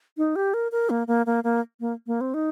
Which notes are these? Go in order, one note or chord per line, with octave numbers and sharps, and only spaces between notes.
D#4
G4
A#4
A#4
A#3
A#3
A#3
A#3
A#3
A#3
C4
D#4